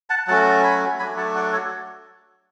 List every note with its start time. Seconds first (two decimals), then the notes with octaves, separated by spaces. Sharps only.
0.10 F#5 A5
0.27 F#3 A3 C#4 F#4 F#5 A5
0.64 G#5 B5
0.99 F#3 A3 D4 F#4 G#5 B5
1.17 F#5 A5
1.35 D5 F#5
1.52 A4 C#5